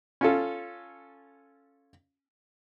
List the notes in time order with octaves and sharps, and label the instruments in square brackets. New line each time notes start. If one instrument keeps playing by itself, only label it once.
[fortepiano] C#4 F4 A4